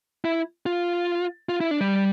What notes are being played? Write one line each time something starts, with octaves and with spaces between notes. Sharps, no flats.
E4
F4
F4
E4
D4
G3